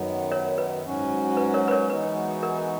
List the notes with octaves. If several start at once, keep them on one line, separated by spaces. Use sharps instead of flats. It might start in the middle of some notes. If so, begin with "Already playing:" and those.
Already playing: F#2 D#3 F#3 B3
A#4 C#5
B4
G#2 F#3 C#4 F#4
B4
A#4 C#5
B4
A#4 C#5
E3 G#3 B3 D#4 F#4 B4
A#4